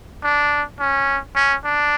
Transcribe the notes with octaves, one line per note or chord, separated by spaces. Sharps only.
D4
C#4
C#4
D4